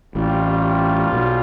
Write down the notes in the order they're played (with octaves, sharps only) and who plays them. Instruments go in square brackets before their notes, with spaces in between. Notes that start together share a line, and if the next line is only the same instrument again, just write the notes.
[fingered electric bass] A1 A2 [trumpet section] G3 C4 F4
[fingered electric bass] B1 B2